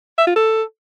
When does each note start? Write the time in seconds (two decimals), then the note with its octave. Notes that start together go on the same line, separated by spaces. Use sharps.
0.18 E5
0.27 F4
0.36 A4